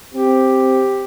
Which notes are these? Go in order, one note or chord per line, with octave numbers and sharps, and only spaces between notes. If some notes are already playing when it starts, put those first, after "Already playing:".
C4 G4